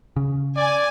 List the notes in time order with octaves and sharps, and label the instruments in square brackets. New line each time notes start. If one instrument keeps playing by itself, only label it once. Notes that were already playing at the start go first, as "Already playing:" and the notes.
[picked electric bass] C#3
[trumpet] D5 [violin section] G#5